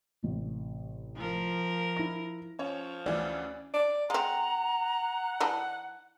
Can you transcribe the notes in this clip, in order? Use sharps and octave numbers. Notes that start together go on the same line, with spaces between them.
A1 C3
F3 A#4
E4 A#6
F3 C#4 C#5
D2 E3 D5
D5
G#3 C4 F#5 A#5
E3 D4 D#4